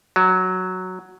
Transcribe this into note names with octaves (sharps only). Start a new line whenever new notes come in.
F#3